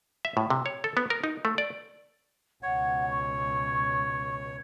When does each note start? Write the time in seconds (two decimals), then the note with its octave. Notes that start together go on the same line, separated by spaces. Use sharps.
0.25 E5
0.37 A2
0.50 C3
0.66 C#5
0.84 A4
0.97 B3
1.10 A#4
1.24 D#4
1.45 A3
1.58 D5
2.63 C#2 B2 C#5 F#5
3.10 C#6